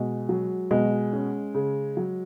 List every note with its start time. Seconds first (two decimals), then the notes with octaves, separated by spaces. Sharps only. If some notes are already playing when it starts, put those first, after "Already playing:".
Already playing: B2 G#3
0.29 F#3
0.71 B2 G#3
1.13 C#4
1.55 C#3
1.97 F#3